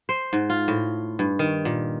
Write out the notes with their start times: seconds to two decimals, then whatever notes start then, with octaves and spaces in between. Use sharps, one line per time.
0.09 C5
0.33 G#2
0.50 F4
0.68 A2
1.19 G2
1.39 D#3
1.65 A#2